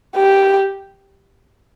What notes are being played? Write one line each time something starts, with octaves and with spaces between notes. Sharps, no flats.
G4